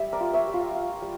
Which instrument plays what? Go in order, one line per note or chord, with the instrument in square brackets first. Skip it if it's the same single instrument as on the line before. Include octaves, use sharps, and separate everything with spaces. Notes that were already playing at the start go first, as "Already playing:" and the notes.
Already playing: [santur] G3 E5
A#4 D5
F4
C#5 E5
G3
F4
F4
G3